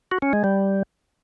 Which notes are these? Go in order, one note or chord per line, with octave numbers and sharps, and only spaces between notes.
F#4
C#4
G#3
G3